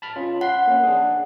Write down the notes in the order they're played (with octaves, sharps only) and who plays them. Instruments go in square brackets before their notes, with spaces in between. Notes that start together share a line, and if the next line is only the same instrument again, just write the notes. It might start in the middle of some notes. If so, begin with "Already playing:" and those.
[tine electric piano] A5 B5 F6
C#4 F4
[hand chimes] F#5 [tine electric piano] B5 C6 C7
[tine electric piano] A#3 C#4
D4 G#4